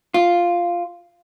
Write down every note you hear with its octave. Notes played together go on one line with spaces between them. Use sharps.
F4